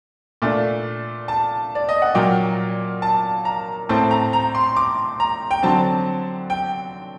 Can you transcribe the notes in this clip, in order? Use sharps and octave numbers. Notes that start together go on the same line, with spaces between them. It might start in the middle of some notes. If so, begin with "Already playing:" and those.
A#2 A3 D4
A5
D5
D#5
F#5
A#2 F#3 A#3 G5
A5
A#5
A2 A3 C4 A5
A#5
A#5
C6
D6
A#5
G5
D3 F#3 C4 A5
G5